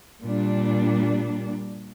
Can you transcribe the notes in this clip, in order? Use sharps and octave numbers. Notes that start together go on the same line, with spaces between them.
A#2 G3 D4